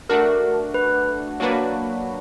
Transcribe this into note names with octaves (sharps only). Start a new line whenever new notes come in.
A3 D4 F#4 A#4
B4
F#3 A#3 D4 F#4 B4